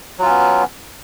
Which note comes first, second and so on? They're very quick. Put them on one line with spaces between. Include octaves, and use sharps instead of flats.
F#3 F4 C#4 B3